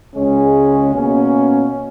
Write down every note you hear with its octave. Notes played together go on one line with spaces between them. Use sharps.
C#2 C#3 G#3 C#4
B2 A#3 C#4